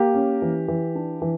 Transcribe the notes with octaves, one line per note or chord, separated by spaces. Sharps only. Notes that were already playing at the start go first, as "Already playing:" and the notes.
Already playing: A#3 G4
C#4
E3
E3
D4
E3